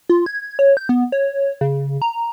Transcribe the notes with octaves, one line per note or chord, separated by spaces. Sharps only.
F4
G#6
C#5
G6
B3
C#5
C#3
A#5